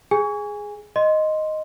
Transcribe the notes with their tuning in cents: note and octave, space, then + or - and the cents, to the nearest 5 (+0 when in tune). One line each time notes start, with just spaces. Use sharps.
G#4 +0 G#5 -15
D#5 +0 C6 +0